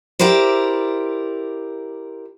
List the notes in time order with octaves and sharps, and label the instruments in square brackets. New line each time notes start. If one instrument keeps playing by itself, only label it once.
[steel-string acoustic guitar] E4 G4 A#4 C5 D5